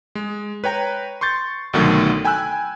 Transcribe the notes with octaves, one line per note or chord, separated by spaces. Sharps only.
G#3
B4 C#5 G5 A#5
C6 C#6 G6 A6
C2 B2 D3 D#3 F#3 A3
G5 G#5 B5 E6 F#6